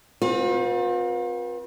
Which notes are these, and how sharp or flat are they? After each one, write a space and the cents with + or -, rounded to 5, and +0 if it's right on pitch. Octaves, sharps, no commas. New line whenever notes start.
C4 +0 F4 +45 B4 -40